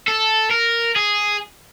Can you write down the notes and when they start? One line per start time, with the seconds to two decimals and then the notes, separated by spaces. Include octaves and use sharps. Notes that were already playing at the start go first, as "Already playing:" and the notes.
0.08 A4
0.51 A#4
0.96 G#4